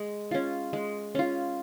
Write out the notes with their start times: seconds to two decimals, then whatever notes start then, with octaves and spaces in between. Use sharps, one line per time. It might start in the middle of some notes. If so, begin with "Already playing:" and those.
Already playing: G#3
0.31 C#4 F4
0.73 G#3
1.15 C#4 F4